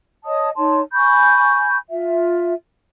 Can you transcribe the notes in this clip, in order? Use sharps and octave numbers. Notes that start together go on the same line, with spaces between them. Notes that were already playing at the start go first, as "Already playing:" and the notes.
C#5 D#5 A5 D#6
D#4 C#5 A5 C6
G#5 B5 C#6 G6
F4 E5